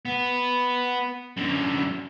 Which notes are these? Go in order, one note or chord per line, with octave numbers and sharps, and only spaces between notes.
B3
F#2 D3